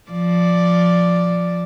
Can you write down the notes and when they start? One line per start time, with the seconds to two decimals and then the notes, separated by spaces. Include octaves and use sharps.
0.11 F3 D5